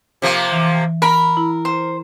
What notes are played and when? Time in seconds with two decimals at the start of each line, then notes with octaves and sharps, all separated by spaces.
0.22 C3 F3 A#3
0.52 E3
1.02 A#4 B5
1.37 E4
1.65 C5